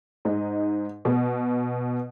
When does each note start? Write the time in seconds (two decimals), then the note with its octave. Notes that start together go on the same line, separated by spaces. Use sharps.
0.25 G#2 D#4
1.05 B2